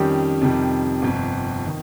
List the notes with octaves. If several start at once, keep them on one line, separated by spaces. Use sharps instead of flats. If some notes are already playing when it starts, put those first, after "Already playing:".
Already playing: F2 D#3 G3 C#4 G4
F2 C3 D#3 G3
G1 F2 C3
D#3